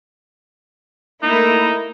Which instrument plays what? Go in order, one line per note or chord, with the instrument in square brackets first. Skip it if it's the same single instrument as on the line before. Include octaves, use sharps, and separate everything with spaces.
[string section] A3 A#3 E4 [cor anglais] D#4